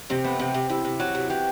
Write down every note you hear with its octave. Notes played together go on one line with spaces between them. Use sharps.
C3 C4
A3 B3
C3 C4
C3
C3 E4
C3
F#3 F#4
C3
E3 G4